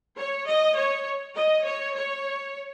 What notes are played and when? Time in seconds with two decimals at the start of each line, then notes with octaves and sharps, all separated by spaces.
0.17 C#5
0.46 D#5
0.76 C#5
1.35 D#5
1.65 C#5
1.95 C#5